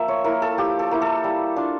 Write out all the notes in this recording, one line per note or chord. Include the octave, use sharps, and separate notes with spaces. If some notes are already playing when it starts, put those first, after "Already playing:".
Already playing: F3 A#3 E5
C#5
A#3 E4 A#4
A4
F3 G4
A4
A#3 E4
A4
G3
D4 F4